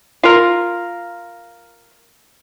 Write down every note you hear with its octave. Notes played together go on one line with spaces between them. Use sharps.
F4 A#4